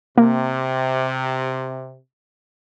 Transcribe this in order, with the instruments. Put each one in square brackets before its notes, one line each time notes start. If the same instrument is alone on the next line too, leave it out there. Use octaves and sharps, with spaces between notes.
[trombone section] C3 [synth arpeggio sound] A#3